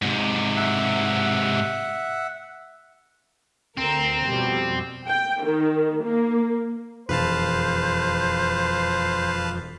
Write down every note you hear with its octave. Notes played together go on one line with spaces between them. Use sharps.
G#2 C3
E5 F#5
D2 C4 A#4
F2 B2 G3
G5
D#3
A#3
E1 F2 B4 C5 F5 A5